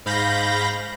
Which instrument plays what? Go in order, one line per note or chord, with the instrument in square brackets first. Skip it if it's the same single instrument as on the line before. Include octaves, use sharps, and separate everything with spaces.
[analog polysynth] G#2 F5 B5 G6 A#6